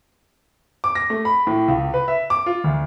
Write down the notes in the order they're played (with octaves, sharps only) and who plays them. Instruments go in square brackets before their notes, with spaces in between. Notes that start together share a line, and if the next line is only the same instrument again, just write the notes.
[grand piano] D6
A#6
A3
B5
A2
C#2
B4
E5
D6
F4
D2